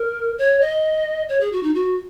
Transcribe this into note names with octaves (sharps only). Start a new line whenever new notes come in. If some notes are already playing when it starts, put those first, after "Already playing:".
Already playing: A#4
C#5
D#5
C#5
G#4
F#4
D#4
F#4